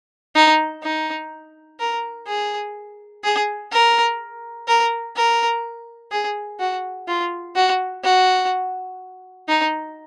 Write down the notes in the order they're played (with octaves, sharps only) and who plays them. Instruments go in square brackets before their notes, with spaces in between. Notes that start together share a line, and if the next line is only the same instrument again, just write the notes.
[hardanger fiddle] D#4
D#4
A#4
G#4
G#4
A#4
A#4
A#4
G#4
F#4
F4
F#4
F#4
D#4